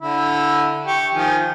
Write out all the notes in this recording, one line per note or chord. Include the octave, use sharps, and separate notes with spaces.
D3 E4
G4 C#6
D#3 F3 G#5